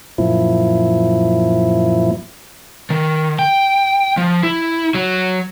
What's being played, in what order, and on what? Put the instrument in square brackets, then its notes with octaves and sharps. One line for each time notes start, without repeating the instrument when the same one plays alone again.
[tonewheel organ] F#2 A#2 F3 E4
[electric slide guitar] D#3
G5
F3
E4
F#3